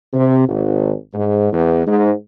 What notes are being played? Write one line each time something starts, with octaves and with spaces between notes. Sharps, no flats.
C3
G#1
G#2
E2
G#2